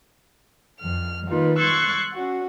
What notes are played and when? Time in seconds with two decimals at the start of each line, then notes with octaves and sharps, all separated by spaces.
0.80 F2 F6
1.26 D#3 A#3 D#4 F4 B4
1.59 C6 C#6 E6 F#6 G#6 A6
2.12 C#4 F#4